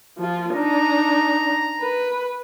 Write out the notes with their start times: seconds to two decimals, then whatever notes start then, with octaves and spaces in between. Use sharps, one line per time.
0.18 F3 F4
0.54 D4 D#4 A#5
1.80 B4